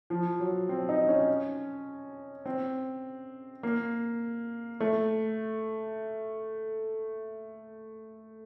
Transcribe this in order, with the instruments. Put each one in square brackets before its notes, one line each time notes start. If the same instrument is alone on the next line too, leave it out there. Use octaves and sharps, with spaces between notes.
[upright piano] F3
F#3
C4
D#4
C#4
C4
A#3
A3